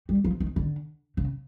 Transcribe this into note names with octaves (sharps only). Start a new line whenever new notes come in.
G3
F3
D#3
D3
C#3